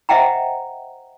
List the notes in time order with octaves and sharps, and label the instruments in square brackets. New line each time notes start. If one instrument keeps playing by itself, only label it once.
[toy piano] C5 D#5 E5 F#5 G5 A#5